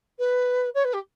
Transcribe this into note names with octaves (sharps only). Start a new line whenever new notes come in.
B4
C#5
B4
G4